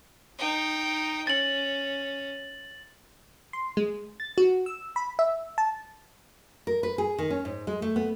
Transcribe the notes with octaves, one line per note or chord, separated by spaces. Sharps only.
D#4 G5
C#4 A6 F#7
C6
G#3
A6
F#4
E6
B5
E5
A5
A#4
B4
G#4
D#3
C#4
G#2
G#3
A3
B3